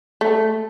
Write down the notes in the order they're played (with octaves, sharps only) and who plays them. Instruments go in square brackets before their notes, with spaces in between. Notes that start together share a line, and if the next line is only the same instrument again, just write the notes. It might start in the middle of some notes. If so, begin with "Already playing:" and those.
[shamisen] A3